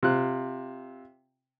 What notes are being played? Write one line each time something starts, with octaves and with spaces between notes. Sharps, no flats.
C3 F4 F#6